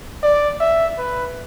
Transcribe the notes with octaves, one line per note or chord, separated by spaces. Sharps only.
D5
E5
B4